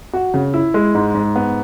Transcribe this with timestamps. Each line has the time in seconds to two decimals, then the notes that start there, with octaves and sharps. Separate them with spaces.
0.13 F#4
0.34 C#3
0.54 E4
0.74 G#3
0.95 G#2
1.14 G#2
1.36 B3